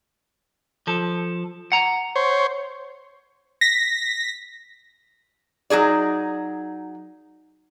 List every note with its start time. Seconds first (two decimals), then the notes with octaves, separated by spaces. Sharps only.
0.87 F3 A4
1.72 F#5 A#5
2.16 C5 C#5
3.61 A#6 B6
5.70 F#3 D#4 G#4 D5